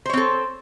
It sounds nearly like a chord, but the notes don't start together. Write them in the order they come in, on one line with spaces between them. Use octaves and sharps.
C5 C#5 C4 A4